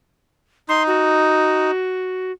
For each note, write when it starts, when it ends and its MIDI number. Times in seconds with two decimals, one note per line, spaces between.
0.69 1.71 63
0.69 0.83 84
0.87 2.32 66